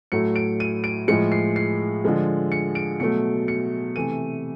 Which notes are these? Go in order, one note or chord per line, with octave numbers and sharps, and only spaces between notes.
A2 F#3 A3 C#7
D7
D#7
D7
A2 F3 G#3 C#7
C7
C7
D3 F3 G#3
C#7
D7
B2 F#3 A3 C#7
C#7
C3 E3 A3 D#7